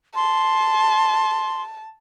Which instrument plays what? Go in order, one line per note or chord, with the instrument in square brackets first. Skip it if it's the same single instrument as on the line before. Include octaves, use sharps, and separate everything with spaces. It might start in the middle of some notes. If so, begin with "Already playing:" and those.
[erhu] A5 [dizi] C6